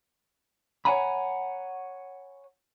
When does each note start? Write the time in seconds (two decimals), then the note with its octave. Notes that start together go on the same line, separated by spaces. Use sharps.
0.85 C#5 D#5 F#5 G#5 A#5 B5